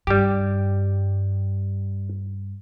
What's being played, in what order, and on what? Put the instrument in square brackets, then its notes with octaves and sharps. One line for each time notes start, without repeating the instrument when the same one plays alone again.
[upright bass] G2 [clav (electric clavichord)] G3 G4